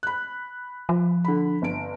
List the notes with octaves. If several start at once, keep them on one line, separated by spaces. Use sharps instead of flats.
B5 F#6
F3
D3 B5
G1 D7